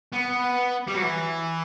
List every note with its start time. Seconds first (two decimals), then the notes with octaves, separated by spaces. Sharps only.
0.13 B3
0.88 G3
0.95 F#3
1.02 E3